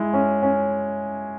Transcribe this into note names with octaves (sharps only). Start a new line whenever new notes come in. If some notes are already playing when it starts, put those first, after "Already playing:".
Already playing: G#3 E4
C#4
C#4